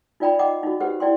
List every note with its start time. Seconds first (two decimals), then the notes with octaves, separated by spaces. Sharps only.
0.20 D#4 F4 D5 G5 A#5 B5
0.39 D#5 F#5 G5 A#5 D6
0.63 D#4 F#4
0.80 G4 B4 C5 F#5
1.00 E4 D5 G5 C6